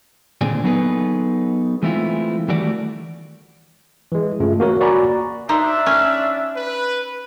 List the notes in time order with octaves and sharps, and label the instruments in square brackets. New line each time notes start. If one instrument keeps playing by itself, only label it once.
[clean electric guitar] D#2 A#2 D3 C4 G#4 D5
F#3 B3 D#4 G#4 A4 B4
E3 G#3 A3 C4 E4 F4
D#3 E3 G3 A3 F#4 D5
[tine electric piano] E3 G#3
G2 C#3 A3 F4
A#3 F#4 A#4 C#5
F#4 D5 G#5 A#5 B5
[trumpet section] D4 E5 [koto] D#4 C5
[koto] C#4
[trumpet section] B4